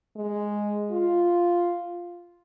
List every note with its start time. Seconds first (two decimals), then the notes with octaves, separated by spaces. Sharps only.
0.16 G#3
0.92 F4